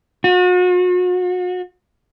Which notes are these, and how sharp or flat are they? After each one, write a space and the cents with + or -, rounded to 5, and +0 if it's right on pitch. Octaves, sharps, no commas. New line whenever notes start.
F#4 -40